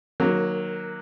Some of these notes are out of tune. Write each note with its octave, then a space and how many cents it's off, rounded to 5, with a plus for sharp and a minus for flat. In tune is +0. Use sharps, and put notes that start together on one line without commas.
D#3 -25 F#3 -5 A#3 +5